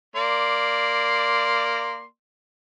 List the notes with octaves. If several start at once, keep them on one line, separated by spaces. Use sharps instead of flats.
A#3 D5 C6